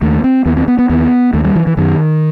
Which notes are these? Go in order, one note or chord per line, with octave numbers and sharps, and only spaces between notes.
D#2 A3
C4
D#2 B3
C4
B3
B3
D#2 B3
D#2 A3
G3
E3
E3
F#2 D#3